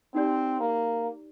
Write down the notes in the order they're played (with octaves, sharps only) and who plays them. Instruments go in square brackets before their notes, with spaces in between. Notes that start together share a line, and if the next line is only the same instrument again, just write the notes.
[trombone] C4 [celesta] D#4 G4 D5
[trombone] A#3